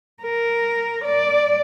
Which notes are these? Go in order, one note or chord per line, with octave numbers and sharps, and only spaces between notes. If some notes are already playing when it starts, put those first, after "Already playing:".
A#4
D5